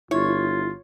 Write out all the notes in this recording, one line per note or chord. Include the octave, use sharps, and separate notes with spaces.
G1 E4 F4 C#5